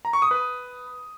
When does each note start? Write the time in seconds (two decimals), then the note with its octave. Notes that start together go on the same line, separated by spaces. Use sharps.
0.05 A#5
0.13 C#6
0.22 D#6
0.31 B4